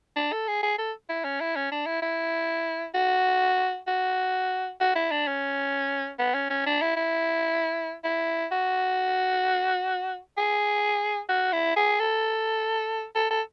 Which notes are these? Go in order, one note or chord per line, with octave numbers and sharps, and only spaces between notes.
D4
A4
G#4
G#4
A4
E4
C#4
E4
C#4
D4
E4
E4
F#4
F#4
F#4
E4
D4
C#4
B3
C#4
C#4
D4
E4
E4
E4
F#4
G#4
F#4
E4
G#4
A4
A4
A4